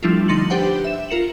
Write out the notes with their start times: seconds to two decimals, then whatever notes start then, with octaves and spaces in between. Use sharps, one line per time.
0.03 F3 G3 A3 D4 E4 F4
0.28 D3 D#4 C6 A6 C#7 F#7
0.50 D4 G4 B4 C5 F#5 G5
0.84 E5 E7
1.09 F4 A#4 C#7 E7 F#7